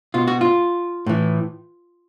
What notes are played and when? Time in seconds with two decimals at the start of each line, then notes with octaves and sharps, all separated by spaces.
0.14 B2 F4
0.28 F#4
0.41 F4
1.06 A2 E3